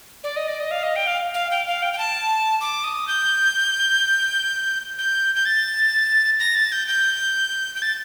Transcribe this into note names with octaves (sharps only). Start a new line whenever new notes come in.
D5
D#5
D5
D#5
F5
D#5
G5
F5
F5
G5
F5
G5
G5
A5
D6
D#6
G6
G6
G6
A6
A#6
A6
G6
G6
G6
A6